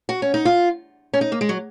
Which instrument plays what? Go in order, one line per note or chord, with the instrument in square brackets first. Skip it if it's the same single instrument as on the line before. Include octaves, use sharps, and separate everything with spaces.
[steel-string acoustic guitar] F#4
C#4
D#4
F4
C#4
D#4
A#3
G#3
F#3